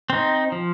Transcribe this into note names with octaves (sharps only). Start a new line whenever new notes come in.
C4 D#4
F3